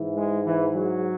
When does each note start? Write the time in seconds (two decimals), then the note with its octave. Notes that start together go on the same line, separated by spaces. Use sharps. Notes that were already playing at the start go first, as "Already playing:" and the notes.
Already playing: G#2 E3
0.15 G#3
0.46 E3
0.75 F#3